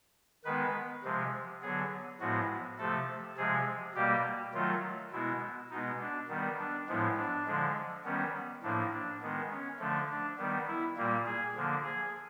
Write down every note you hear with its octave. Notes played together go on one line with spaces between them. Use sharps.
D#3 G#3 B3 B4
C3 F3 G#3
D3 F#3 B3 G#4
A2 F3 G#3 B3 F#4
C3 F3 A3 A4
C3 F3 G#3 G#4
B2 G3 A#3 G4
D#3 F#3 A3 F4
B2 G#3 B3 E4
B2 G#3 B3 D#4
D4
D#3 G3 B3
D4
A2 F3 G#3 B3
D4
D3 F3 G#3
D#3 G3 B3 C#4
A2 F3 A#3 D4
D4
D#3 G#3 B3
C#4
D3 F3 A3
D4
D#3 G3 B3
E4
A#2 G3 A#3
G#4
D3 F3 A#3
G#4